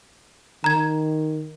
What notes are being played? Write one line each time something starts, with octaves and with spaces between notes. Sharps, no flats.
D#3 A#5 G#6